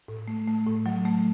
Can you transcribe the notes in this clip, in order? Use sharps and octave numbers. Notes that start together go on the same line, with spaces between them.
A2
A3
A3
A2
F#3
A3